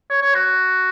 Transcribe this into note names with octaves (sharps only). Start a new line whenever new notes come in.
C#5
C#5
F#4